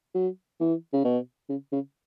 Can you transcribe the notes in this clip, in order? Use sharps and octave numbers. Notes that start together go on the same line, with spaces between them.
F#3
E3
C#3
B2
C#3
C#3